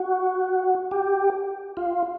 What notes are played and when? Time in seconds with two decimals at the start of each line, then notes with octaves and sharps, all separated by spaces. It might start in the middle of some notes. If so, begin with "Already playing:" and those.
Already playing: F#4
0.91 G4
1.77 F4